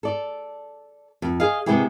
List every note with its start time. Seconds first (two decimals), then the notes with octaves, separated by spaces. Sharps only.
0.03 A4 D5
1.22 F2
1.40 G#4 D#5 F5
1.66 C3 G#3 B3 E4 G4 G#4